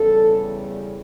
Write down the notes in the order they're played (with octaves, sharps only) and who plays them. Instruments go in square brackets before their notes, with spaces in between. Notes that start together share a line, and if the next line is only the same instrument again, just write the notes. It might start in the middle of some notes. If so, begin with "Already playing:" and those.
Already playing: [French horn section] E2 C#3 G3 A4